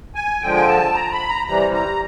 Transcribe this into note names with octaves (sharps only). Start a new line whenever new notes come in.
G#5
D3 F3 G#3 G5
G#5
A5
A#5
B5
A#5
C3 E3 G3 A#5
A#5